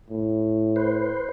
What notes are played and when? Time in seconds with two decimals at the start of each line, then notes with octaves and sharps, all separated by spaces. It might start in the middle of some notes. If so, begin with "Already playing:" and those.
0.10 A2
0.76 B4 C5